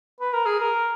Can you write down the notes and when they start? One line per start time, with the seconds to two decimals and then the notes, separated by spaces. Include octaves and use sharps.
0.21 B4
0.33 A#4
0.46 G#4
0.60 A#4